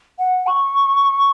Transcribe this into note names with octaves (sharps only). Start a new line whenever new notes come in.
F#5
C#6